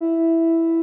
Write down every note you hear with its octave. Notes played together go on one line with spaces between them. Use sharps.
E4